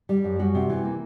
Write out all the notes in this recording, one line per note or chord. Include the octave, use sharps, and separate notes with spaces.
G3
F#2
G3 F#4
C3
E3
A#3